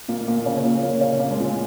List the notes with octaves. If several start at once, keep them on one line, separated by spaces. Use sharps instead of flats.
A#2 A#3
A#2 A#3
C#3 C#4
C#4
A#2 A#3
A#2 A#3
C#3 C#4
A#3
G#3
A#2 A#3